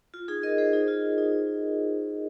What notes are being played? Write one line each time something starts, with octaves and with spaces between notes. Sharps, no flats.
F4
D#4 G#4
A#4 D#5
G#4 C5
D#4 G#4
F4
D#4